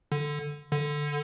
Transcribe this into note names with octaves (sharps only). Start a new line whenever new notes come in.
D3
D3